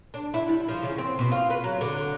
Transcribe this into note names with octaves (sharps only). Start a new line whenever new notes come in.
D4
E4
G3
F3
C#3
C4
B2
F4
B4
F#3
D3